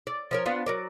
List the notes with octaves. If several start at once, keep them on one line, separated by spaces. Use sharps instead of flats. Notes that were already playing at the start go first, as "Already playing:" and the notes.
D5
F3 C#4 A#4
B3 D4 F4
F#3 A#4 D5